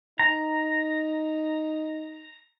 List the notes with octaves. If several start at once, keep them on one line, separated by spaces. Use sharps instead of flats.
D#4 A#5